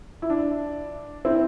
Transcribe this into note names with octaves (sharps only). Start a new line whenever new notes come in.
E4
D4
C4 E4